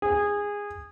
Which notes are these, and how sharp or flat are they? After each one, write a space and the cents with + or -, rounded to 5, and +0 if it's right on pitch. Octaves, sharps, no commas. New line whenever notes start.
G#4 -15